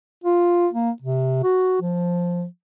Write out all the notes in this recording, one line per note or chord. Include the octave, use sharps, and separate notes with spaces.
F4
A#3
C3
F#4
F3